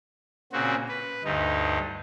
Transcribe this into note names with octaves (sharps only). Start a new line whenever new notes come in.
A#2 C#3 C4 F#4
B4
D2 G2 D#4